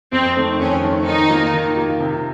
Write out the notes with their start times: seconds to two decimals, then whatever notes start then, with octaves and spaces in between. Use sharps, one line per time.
0.12 F2 C4
0.36 D#3 A3 C4
0.59 F2 C#4
0.83 D#3 A3 C4
1.06 D#3 D#4
1.30 A#3 F4
1.53 D#3
1.77 A#3 F4
2.00 C3